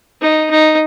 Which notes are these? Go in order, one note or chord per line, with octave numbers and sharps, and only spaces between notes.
D#4
D#4